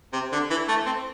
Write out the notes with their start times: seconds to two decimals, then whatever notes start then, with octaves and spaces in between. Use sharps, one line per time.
0.13 C3
0.32 D3
0.50 E3
0.68 A3
0.86 C4